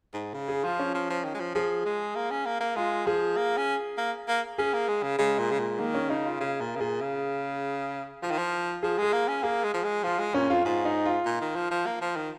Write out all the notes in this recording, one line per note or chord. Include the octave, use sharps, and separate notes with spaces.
G#2
C#3
G#4
F3 F4
C#4
F3
F3
D#3
G#3
F3
F3 G#4
G#3
A#3
C#4
A#3
A#3
G#3 F4
F3 G#4
A#3
C#4
A#3
A#3
C#4 G#4
A#3
G#3
C#3
C#3 G#3
A#2
C#3
A#2
D#3 A#3
C#4
C#3 D#4
F4
C#3 G#4
A#2 A#4
C#3
A#2 G#4
C#3
F3 F4
D#3
F3
F3 G#4
G#3 G#4
A#3
C#4
A#3 G#4
G#3
F3
G#3
F3 F4
G#3
A#2 C#4
F2 F4
G#2 F4
D#4
F4
A#2
D#3
F3
F3
A#3
F3
D#3